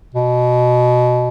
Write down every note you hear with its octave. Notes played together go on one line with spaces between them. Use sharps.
B2